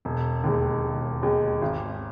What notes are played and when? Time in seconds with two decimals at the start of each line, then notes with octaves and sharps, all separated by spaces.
0.05 E1
0.44 D#2 D#3 G#3
0.84 E1
1.23 D#2 D#3 G#3
1.62 G#1